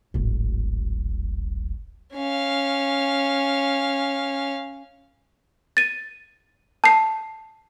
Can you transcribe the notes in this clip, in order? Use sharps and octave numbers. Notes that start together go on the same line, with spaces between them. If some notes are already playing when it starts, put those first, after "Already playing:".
D1 G#1
C#4 F5
A6 D#7
A5 C7